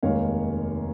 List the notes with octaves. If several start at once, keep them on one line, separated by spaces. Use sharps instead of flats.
F1 D#2 D#3 G#3 C#5 F5